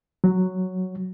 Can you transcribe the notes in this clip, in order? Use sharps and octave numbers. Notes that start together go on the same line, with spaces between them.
F#3